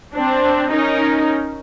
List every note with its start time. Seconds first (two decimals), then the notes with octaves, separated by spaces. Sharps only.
0.14 C4 D4
0.71 C#4 D#4 A#4